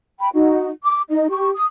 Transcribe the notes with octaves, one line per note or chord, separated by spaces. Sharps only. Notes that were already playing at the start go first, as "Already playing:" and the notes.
G5 B5
D#4 F#4
D6
D#4 D#5
G4 C#6
D#6